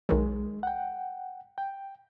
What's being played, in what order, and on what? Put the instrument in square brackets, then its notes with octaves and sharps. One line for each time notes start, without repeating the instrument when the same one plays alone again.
[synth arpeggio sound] B1 D#3 F#3 [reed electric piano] G#3
[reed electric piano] F#5 G5
G5